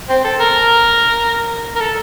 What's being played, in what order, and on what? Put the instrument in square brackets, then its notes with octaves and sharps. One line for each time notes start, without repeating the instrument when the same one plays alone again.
[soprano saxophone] C4
A4
A#4
A#4
A4